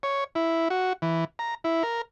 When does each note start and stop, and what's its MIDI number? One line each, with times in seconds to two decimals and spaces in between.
0.03 0.24 73
0.35 0.68 64
0.70 0.93 66
1.02 1.25 52
1.39 1.55 82
1.64 1.83 64
1.83 2.02 70